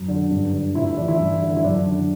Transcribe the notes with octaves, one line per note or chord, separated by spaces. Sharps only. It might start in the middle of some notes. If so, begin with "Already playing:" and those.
Already playing: F#2
D3
G2
D3
A2 E4
E4
E3 D4
E4
G2
D3
E4
F#2 D4
D3